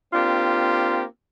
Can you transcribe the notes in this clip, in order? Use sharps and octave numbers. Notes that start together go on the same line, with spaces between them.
A#3 C4 D4 F4 G4